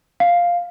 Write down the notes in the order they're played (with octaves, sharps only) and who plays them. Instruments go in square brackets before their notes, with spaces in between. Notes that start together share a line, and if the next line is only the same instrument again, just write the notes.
[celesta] F5